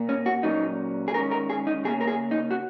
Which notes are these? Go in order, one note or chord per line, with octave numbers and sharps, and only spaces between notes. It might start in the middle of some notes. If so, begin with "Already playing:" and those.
Already playing: A#2 A#3
C#4
F#4
A#2 F#3 C#4 D#4
G#4
D#3 G#3 C#4 A#4
A#4
G#4
D#4
C#3 A#3 C#4 G#4
A#4
G#4
D#4
F#4